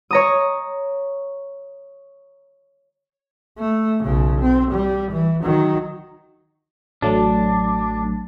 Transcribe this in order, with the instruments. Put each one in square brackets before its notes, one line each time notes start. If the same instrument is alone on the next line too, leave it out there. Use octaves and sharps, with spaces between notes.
[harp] C#5 A#5 D#6
[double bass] A3
B1 C#3
C4
G3
E3
D#3 F#3
[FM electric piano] A1 F#3 A3 [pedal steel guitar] D4